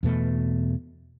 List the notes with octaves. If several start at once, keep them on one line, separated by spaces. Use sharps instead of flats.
E2 B2 A3